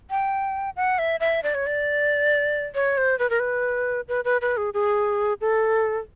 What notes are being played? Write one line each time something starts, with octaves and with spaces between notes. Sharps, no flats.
G5
F#5
E5
E5
D5
C#5
D5
C#5
C5
B4
A#4
B4
B4
B4
B4
G#4
G#4
A4